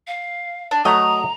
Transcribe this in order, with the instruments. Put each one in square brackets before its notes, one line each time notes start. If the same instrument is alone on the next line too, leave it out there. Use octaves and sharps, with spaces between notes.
[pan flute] F5
[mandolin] D4
[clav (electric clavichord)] F#3 A3 [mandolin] D#5 [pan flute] A#5